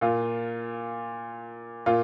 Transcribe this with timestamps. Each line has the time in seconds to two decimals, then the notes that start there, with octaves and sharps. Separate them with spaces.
0.01 A#2 F4
1.86 A#2 F4